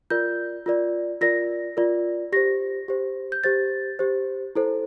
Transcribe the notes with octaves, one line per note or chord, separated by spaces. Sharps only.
F4 A#4 D5 G6
F4 A#4 D5
F4 A#4 D5 A#6
F4 A#4 D5
G4 C5 A#6
G4 C5
G6
G4 C5 A6
G4 C5
E4 A4 C5